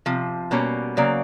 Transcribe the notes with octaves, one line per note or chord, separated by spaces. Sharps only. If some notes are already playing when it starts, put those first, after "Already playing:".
C3 F3
B2 G3 A#3 C#4
C#3 F#3 A#3 D5